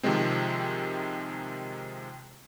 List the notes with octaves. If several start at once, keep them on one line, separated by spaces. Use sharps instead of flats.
C3 D#3 F3 G#3 C4